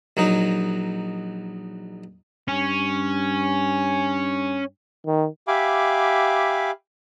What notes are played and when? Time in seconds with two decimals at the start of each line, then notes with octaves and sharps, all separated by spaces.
0.17 A#1 F#3 D#4
2.48 G2 C#4
5.06 D#3
5.48 G4 E5 F5 G#5 B5 D6